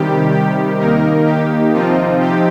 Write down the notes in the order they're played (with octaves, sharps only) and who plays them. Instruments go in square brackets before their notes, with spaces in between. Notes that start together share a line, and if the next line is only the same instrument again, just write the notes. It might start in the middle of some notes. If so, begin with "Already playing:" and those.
Already playing: [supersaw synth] C3 D#3 G3 G4
G4
D#2 D#3 A#3 D#4 A#4
G4
C3 F3 C4 D#4 F4
G4